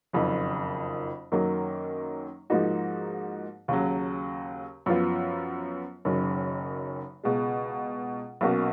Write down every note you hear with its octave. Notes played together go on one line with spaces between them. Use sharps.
F#1 F2 D#3
F#2 D#3 F#3 A#3
G#2 F3 A#3 D#4 F#4
D#2 C#3 F#3
F#2 F3 B3 F4
F#1 F#2 D#3
C#2 B2 G#3
B1 B2 A#3 C#4 F#4